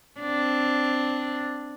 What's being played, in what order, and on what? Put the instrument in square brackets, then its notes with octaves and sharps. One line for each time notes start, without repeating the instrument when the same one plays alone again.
[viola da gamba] C4 D4